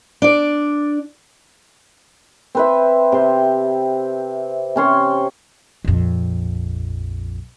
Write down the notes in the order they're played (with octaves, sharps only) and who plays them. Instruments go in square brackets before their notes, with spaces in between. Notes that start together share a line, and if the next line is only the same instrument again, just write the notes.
[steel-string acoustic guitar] D4 D5
[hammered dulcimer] C4 B4 E5
C3 C6
C3 C#4 C6
[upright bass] A#1 F2